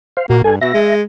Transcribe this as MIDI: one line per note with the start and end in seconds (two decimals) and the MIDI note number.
0.17 0.26 72
0.17 0.26 77
0.30 0.42 46
0.30 0.43 58
0.30 0.42 66
0.44 0.58 43
0.44 0.55 69
0.44 0.55 80
0.61 0.70 47
0.61 0.95 76
0.61 0.95 94
0.74 1.02 56